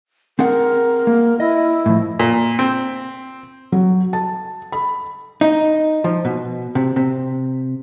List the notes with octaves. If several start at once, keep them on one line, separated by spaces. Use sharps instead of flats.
C4 G#4 A#4 F#5
A#3
E4 D#5
A2 F3
A#2
C4
F#3
A5
B5
D#4
F3
B2
C3
C3